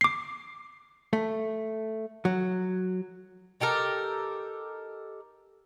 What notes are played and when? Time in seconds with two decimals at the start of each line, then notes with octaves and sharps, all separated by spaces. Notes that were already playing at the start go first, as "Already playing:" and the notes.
0.01 D6 C7
1.13 A3
2.25 F#3
3.60 D#4 G4 A4 A#4